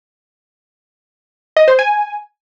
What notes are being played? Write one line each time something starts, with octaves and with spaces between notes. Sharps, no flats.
D#5
C5
G#5